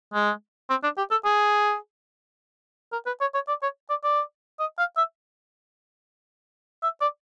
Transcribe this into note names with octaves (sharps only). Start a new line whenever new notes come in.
G#3
C4
D4
G4
A4
G#4
A#4
B4
C#5
C#5
D5
C#5
D5
D5
D#5
F5
E5
E5
D5